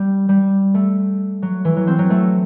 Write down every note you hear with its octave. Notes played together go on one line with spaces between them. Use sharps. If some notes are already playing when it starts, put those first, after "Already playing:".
Already playing: G3
G3
A3
F#3
E3
F#3
C4
F#3
A3